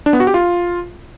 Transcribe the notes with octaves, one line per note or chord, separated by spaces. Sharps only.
D4
B3
F#4
G4
F4